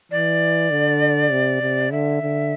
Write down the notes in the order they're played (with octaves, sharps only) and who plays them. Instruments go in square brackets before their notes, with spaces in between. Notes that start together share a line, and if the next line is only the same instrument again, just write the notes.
[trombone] E3 [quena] D5
[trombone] D3
C3
C3
[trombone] D3 [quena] E5
[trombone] D3